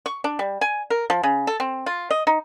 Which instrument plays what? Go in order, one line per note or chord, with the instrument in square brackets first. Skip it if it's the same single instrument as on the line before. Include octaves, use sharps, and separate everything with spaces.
[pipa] C#6
D4
G3
G#5
A#4
F3
C#3
A4
C4
F4
D#5
D#4